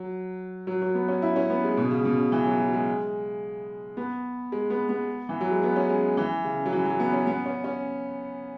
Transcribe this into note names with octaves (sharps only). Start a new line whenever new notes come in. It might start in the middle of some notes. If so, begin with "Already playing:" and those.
Already playing: F#3
F#3
F#3
B3
C#4
E4
C#4
B3
G#3
B2
C#3
B2
C#3
E3
F#3
F#3
G#3
B3
G#3
B3
B3
E3
F#3
G#3
B3
C#4
G#3
E3
C#3
F#3
E3
F#3
B3
C#4
B3
C#4
C#4